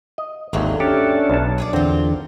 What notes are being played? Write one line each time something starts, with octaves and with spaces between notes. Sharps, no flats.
D#5
G#1 D#2 D3 E3 F#3
C#4 D4 G4 A4
B1 A5
G#4 C#5 D5
E2 A#2 D3 C4 F4